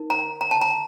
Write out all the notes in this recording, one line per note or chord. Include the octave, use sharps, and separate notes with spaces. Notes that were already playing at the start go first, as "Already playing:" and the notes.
Already playing: D#4 A#4
A#5
A#5
A5
A#5